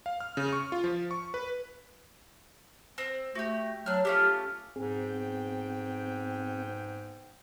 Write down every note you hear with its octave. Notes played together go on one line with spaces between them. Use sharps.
F5
F6
C#3
C#6
F4
F3
C#6
B4
C4
A3 F#4 G4
F#3 D4 F6
A3 C#4 F4 G4
B1 G#2 B3 C4 G#4 G5